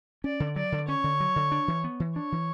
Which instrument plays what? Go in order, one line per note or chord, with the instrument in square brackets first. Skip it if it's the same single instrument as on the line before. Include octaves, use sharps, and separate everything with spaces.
[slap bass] C#4 [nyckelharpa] D5
[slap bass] D3
[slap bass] F#3 [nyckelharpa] D5
[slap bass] D3
[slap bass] C#4 [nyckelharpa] C#5
[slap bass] D3
F#3
D3
D4
E3
B3
E3
[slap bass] D4 [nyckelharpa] C#5
[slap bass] E3